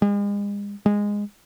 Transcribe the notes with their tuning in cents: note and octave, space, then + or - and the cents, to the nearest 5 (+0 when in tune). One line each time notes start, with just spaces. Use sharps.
G#3 -40
G#3 -10